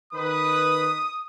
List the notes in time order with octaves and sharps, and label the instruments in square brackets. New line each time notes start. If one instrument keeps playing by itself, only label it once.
[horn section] D#3 B4 [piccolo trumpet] D#6